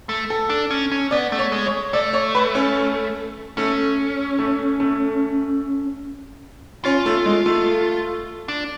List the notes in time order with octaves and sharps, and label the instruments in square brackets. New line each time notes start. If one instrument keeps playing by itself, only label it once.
[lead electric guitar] A3
[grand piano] A4
[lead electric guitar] D4
C#4
C#4
[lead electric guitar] B3 [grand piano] D5
[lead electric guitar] A3
[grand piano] C#5
[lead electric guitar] G#3
[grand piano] C#5
[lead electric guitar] A3 [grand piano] D5
[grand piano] C#5
B4
C#4
[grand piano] A3 [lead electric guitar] C#4
[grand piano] A3
A3
[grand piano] C#4 [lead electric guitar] F4
[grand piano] A3
G#3
A3
[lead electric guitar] D4